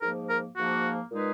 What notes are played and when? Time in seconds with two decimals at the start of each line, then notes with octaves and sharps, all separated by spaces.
0.02 G#2 F3 A#3 A#4
0.30 A#4
0.57 G#2 F3 A#3 F#4
1.12 A#2 G#3 D#4 G#4 B4